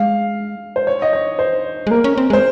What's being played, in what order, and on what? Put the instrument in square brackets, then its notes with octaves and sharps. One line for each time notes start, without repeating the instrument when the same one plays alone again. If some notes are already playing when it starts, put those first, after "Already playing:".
Already playing: [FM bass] G#3 [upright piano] F5
[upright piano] C5
C#5
D#5
C#5
C5
[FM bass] G#3
[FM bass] A#3 [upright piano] A#4
[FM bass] C#4
C4
[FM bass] G#3 [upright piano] C5